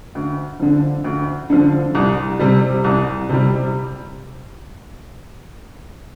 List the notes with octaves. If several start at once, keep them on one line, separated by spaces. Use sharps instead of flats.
D2
D3 F3
D2
D3 F3
C2
C3 G3
C2
C3 G3